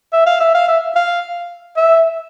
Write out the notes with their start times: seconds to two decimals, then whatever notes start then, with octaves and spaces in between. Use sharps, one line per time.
0.13 E5
0.26 F5
0.40 E5
0.54 F5
0.68 E5
0.96 F5
1.77 E5